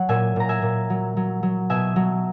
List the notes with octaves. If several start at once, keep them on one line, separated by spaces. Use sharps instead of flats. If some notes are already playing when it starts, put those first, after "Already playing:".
Already playing: F#3 C#5 F#5
A#2 E5 G#5
A#2 A#5
E5 G#5
A#2
F#3
F#3
F#3
B2 E5 G#5
F#3